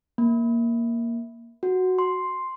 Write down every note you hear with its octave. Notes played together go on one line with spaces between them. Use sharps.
A#3
F#4
C6